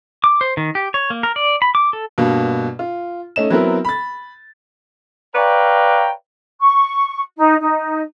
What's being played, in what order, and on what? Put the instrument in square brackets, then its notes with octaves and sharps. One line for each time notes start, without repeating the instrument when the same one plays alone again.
[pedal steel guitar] D6
C5
D#3
G4
C#5
A#3
A#4
D5
B5
D6
A4
[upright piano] G2 B2 A#3
F4
A3 C#4 D#4 E7
F#3 B3 C4 E4 A#4
B5 A6
[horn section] B4 C#5 D5 F5 G5 A#5
[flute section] C#6
D#4
D#4